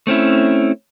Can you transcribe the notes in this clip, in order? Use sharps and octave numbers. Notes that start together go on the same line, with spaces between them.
A3 C4 C#4 E4